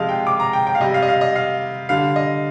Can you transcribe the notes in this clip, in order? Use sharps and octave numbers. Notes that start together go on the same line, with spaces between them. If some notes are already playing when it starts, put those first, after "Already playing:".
Already playing: C3 F3 G#3 D#5 F5
G5
D6
A#5
G5
G5
F5
C3 G3 D#5
F5
D#5
F5
D#5
F5
D3 G3 F5
D#5